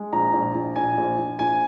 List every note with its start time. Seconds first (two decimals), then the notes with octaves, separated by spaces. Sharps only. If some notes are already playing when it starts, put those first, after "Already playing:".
Already playing: G#3
0.12 A#1 A#5
0.33 A#1
0.55 A#1
0.76 A#1 G#5
0.97 A#1
1.19 A#1
1.39 A#1 G#5